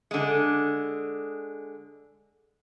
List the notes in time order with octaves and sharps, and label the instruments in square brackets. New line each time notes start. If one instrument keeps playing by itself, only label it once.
[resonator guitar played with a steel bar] D3 G#3